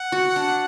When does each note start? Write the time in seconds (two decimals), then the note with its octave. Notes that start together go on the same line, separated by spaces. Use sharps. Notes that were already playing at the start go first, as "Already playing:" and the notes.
Already playing: F#5
0.12 F#4
0.36 D4